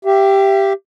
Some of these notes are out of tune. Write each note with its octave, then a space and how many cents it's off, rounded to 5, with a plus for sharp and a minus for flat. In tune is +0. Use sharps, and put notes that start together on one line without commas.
G4 +0 E5 +40